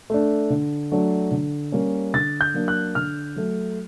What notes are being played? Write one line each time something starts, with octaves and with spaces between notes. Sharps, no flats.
A3 D4
D3
F#3 A3 D4
D3
G3 A#3 C#4
D3 A6
G6
F#3 A#3 D4
F#6
D3 F6
F#3 A3